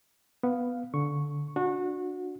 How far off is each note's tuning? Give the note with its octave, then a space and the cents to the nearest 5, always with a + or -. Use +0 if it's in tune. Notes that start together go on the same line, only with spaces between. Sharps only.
B3 +0 F5 +5
D3 -15 C#6 +0
D4 +10 F#4 -25